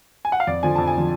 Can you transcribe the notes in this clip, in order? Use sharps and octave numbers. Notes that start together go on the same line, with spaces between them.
G#5
F#5
F5
F2 D5
D3 F3 G#5
F2 A5
G#5
D3 F3